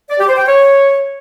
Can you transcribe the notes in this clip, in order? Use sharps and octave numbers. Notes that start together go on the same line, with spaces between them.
D5
G4
C5
G5
C#5